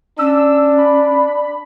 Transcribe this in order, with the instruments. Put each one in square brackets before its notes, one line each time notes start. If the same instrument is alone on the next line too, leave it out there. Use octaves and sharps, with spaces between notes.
[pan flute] C#4 [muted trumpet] D4 [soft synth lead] E6
[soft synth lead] B5